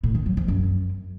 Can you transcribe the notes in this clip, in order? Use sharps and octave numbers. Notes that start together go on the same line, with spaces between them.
A2
D#3
F#3
F3
F#2